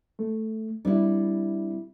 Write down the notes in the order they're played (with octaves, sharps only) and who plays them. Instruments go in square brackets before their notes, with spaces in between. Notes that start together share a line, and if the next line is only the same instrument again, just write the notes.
[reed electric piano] A3
[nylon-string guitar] G3 E4 [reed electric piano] C4 D4